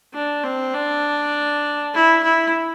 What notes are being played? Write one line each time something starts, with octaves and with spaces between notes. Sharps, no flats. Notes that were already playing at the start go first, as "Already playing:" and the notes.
D4
C4
D4
E4
E4